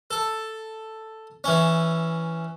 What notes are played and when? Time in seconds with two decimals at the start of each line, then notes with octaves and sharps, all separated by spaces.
0.11 A4
1.44 E3 C#4